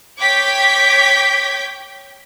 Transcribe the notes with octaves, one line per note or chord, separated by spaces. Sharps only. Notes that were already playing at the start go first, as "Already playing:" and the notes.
C#5 G5 D6 G6 G#6 B6